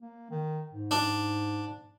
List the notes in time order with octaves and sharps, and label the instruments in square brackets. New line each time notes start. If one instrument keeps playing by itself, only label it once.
[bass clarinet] A#3
D#3
G#2
[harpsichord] D4